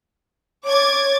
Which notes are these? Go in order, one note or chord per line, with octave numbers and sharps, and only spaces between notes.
C#5 D6 G#6 A6